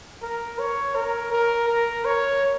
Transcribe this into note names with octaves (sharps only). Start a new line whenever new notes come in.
A#4
C#5
A#4
A#4
A#4
C#5